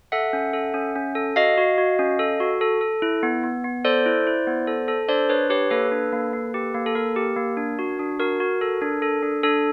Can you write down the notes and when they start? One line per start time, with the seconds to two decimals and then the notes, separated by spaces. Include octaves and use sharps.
0.12 A4 E5 F#5
0.33 C#4
0.53 A4
0.74 C#4
0.96 C#4
1.15 A4
1.36 F#4 D#5 F5
1.58 F#4
1.78 F#4
1.99 C#4
2.19 A4
2.40 F#4
2.61 A4
2.81 A4
3.02 E4
3.23 B3
3.43 B3
3.64 B3
3.85 A4 C5 D5
4.06 E4
4.27 E4
4.47 B3
4.67 A4
4.88 A4
5.08 D4 C5 D5
5.29 D4 B4 C#5
5.50 G4 B4 C#5
5.71 A#3 A4 B4
5.92 D4
6.12 A#3
6.33 A#3
6.54 G4
6.74 A#3
6.86 A4
6.95 A#3 A#4
7.16 G4
7.36 A#3
7.57 D4
7.79 F#4
7.99 D4
8.20 F#4 A#4
8.40 F#4
8.61 A4
8.81 D4
9.02 A4
9.23 D4
9.43 D4 A4